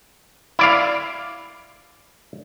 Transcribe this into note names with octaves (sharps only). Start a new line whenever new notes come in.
E4 D5 F5